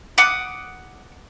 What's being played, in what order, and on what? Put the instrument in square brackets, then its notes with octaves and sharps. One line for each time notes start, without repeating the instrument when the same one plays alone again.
[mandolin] F#5 D6 D#6